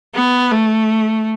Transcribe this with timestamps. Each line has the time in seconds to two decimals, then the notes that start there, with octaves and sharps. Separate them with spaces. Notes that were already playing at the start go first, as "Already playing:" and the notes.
0.15 B3
0.52 A3